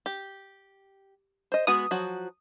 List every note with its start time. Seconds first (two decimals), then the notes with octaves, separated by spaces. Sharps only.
0.06 G4
1.52 C5 D#5
1.67 G#3 B3 F#4 D#6
1.91 F3 F#3 F#4